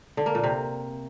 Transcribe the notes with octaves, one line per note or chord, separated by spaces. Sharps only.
D3
A#3
A#2
C3